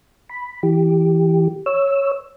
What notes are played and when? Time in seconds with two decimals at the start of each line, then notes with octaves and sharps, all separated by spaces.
0.30 B5
0.63 E3 G4
1.66 C#5 E6